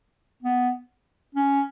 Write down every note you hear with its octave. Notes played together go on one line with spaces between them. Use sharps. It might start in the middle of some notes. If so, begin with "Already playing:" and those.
B3
C#4